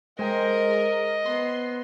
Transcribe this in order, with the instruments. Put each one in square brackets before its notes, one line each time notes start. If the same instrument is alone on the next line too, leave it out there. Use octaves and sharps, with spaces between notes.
[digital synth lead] G#3 [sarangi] A#4 [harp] C5 G5 [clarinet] D#5
[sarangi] B3 [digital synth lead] C6